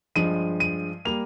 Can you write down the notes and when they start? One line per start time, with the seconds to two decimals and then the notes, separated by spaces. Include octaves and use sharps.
0.16 G2 F3 G#3 D#7
0.60 D#7
1.05 G3 A#3 F7